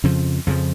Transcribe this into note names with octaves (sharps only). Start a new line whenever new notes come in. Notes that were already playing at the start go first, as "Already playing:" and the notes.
F2 C#3 F3
F2 C#3 F3